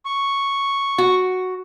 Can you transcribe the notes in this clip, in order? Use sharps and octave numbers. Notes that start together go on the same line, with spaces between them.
C#6
F#4